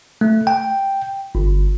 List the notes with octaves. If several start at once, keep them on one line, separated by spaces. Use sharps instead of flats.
A3
G5
G1